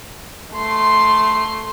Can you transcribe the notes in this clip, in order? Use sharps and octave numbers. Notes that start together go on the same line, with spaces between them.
A3 C6